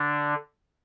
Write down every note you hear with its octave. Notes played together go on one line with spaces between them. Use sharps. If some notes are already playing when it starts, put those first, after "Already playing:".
Already playing: D3 D4